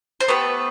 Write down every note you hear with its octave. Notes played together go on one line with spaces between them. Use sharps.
C5
A3 B3 G4 B4